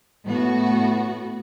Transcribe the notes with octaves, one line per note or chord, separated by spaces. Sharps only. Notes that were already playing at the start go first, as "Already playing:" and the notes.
A2 B3 F#4